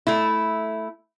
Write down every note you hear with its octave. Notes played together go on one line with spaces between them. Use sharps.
A3 E4